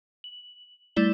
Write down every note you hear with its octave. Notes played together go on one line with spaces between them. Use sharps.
F#7
G3 A3 E4 D5 G7